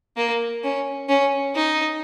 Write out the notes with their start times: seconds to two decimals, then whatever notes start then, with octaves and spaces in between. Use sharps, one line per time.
0.17 A#3
0.64 C#4
1.09 C#4
1.56 D#4